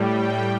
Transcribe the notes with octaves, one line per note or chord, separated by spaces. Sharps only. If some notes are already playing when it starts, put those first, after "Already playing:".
Already playing: A2 G3 G5